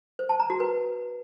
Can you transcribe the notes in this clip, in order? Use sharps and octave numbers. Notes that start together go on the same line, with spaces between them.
C5
A5
A#5
F#4
B4